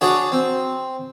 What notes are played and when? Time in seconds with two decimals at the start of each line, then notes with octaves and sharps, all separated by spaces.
0.01 D4 F#4 G#4 C#5 D5
0.32 C4